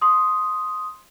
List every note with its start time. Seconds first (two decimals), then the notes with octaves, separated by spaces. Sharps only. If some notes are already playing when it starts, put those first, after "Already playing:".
0.01 C6 D#6